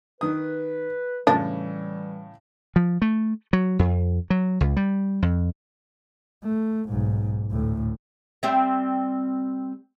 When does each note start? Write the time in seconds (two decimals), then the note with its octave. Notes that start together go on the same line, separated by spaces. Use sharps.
0.21 D#3 B4 D#6
1.27 A2 C#3 E3 G3 D4
2.76 F3
3.02 A3
3.53 F#3
3.79 F2
4.30 F#3
4.61 C#2
4.77 G3
5.22 F2
6.43 A3
6.89 B1 G#2
7.51 D2 A2
8.43 G3 C4 E5